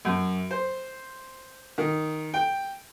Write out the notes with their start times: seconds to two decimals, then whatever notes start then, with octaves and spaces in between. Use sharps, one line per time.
0.05 F#2
0.51 C5
1.78 D#3
2.34 G5